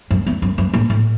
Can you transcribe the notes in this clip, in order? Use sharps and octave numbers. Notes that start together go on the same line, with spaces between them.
F#2
E2
F#2
F#2
A2
A2